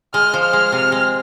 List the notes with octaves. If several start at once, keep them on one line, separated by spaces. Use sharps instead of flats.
G#3 F6
F3
F6
G#3
C3
G#3